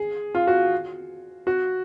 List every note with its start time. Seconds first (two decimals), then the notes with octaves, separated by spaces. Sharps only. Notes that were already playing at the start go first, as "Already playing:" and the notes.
Already playing: G#4
0.35 F4
0.47 F#4
1.47 F#4